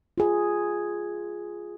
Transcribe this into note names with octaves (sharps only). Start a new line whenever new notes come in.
F4 G#4